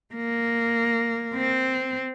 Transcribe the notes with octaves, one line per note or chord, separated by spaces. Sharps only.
A#3
C4